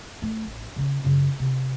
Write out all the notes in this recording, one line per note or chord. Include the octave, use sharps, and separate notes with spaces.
A3
A1
C#3 C#4
F#2 C#3
C3